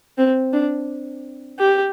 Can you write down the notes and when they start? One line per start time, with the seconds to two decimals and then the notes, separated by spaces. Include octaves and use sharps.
0.18 C4
0.53 D4
1.59 G4